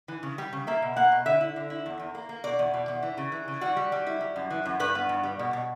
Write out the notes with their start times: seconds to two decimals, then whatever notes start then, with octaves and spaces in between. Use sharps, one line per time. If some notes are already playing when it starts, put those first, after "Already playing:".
0.08 E3
0.23 C#3
0.38 G3
0.53 C#3
0.67 A#3 E5
0.82 B2
0.96 A#3 F#5
1.12 B2
1.26 D3 E5
1.41 E4
1.56 D3
1.70 E4
1.86 E2
1.99 E2
2.15 A#3
2.29 A#3
2.44 B2 D5
2.59 E2
2.73 B2
2.88 E2
3.03 E3
3.18 C#3
3.32 E3
3.48 C#3
3.61 G3 F#4
3.77 G3
3.92 G3
4.06 E4
4.21 G3
4.36 F#2
4.50 E3
4.66 F#2
4.80 G2 B4
4.95 B3
5.09 G2
5.23 G3
5.39 B2
5.53 B2